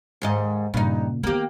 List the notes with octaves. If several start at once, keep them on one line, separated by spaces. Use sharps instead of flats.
D#2 G#2 D#5
G2 A#2 C#3 D#4
D#3 A#3 B3 G4